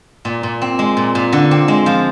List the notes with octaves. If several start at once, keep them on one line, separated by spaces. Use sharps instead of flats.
A#2
A#2
C4
G#3
A#2
A#2
D3
C4
G#3
F3